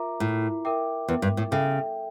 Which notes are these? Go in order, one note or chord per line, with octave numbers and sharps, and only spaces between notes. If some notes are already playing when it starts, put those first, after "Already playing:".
Already playing: F4 A#4 E5 A#5 D6
A2
A#4 E5 G5 D6
E2
G2
A2
C#3 A4 E5 G5